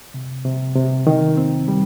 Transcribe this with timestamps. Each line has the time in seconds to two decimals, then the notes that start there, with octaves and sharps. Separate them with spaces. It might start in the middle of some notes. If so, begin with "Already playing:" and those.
0.14 C3
0.45 C3
0.76 C3
1.07 D#3
1.37 C4
1.68 G3